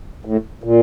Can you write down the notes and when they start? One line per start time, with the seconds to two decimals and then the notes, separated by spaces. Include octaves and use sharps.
0.25 A2
0.64 A#2